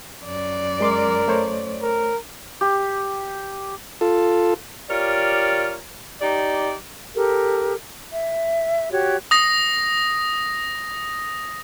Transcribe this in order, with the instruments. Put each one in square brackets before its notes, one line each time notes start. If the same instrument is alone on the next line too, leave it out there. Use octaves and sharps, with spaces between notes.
[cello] F#2 D5
[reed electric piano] G#3 C6 D6 [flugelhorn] A#4
[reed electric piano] A3 C5 C#5
[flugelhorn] A#4
[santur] G4
[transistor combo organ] F4 A4
[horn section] F4 G4 A#4 C#5 D5
D#4 G4 D5
[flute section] G4 A4 A#4
E5
F#4 G4 C#5 F#6
[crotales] D#6 A#6